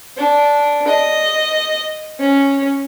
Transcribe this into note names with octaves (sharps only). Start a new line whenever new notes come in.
D4
D#5
C#4